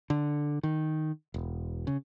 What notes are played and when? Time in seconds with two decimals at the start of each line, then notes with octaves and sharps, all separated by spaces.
0.10 D3
0.63 D#3
1.34 E1
1.87 C#3